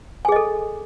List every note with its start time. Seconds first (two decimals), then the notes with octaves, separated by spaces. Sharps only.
0.25 G#5
0.28 G#4
0.32 D#5
0.36 A4